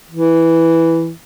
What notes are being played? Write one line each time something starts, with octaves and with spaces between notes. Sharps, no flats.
E3